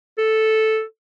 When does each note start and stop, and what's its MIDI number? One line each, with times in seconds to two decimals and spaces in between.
0.18 0.83 69